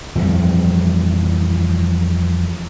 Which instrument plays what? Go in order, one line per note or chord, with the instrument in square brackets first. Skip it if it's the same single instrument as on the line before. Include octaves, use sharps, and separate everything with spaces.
[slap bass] F2 E3 F3 G3